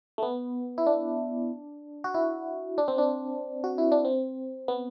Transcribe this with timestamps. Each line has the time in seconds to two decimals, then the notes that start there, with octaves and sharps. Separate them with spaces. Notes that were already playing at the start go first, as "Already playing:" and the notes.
0.18 A3
0.22 B3
0.78 E4
0.86 D4
2.04 F#4
2.14 E4
2.78 D4
2.88 C4
2.98 D4
3.64 F#4
3.78 E4
3.92 D4
4.05 C4
4.68 B3